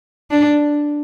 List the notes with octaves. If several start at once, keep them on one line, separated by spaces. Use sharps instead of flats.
D4